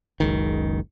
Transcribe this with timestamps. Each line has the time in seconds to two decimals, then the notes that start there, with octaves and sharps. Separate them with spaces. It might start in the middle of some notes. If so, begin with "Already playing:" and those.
0.20 F#1 C#2 D#3